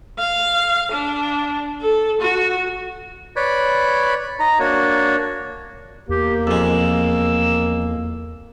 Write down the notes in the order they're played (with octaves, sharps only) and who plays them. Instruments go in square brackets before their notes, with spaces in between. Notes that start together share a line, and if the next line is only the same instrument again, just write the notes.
[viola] F5
D4
A4
F#4
[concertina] B4 C#5 D5 B5
D#4 A#5
A#3 D4 F#4 C#5
[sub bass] E2 [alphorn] A#3 [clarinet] G4
[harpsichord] F2 G#3 [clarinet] E6